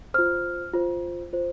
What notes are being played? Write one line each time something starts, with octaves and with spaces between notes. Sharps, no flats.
F4 C5 F6
F4 C5
F4 C5